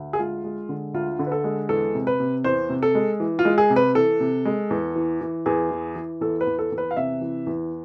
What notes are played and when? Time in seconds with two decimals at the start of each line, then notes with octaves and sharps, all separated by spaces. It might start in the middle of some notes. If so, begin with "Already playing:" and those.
Already playing: D2
0.13 G#4
0.19 G#3 F4
0.44 G#3
0.69 D3
0.94 D2 F4
1.19 D3
1.27 B4
1.32 A4
1.44 G#3
1.69 E2 A4
1.95 C3
2.07 B4
2.20 C3
2.44 E2 C5
2.69 C3
2.83 A4
2.95 G#3
3.20 E3
3.39 F4
3.45 G#3
3.58 G#4
3.70 C3
3.76 B4
3.95 E3 A4
4.20 C3
4.45 G#3
4.71 E2
4.96 E3
5.21 E3
5.46 E2 G#4
5.71 E3
5.96 E3
6.21 E2 A4
6.41 B4
6.47 E2
6.59 A4
6.72 E2
6.78 B4
6.91 F5
6.97 C3 E5
7.21 E3
7.47 E2